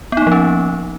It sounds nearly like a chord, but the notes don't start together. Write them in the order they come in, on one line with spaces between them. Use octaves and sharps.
B3 D#4 A#3 F3 C#4